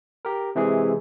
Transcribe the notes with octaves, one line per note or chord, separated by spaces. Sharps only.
G4 A#4
C3 E3 G#3 G#4